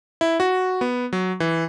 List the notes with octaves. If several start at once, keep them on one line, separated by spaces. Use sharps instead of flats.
E4
F#4
B3
F#3
E3